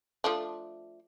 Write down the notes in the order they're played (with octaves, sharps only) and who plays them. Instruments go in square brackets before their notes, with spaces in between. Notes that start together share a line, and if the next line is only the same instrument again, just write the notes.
[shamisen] F3 A3 D4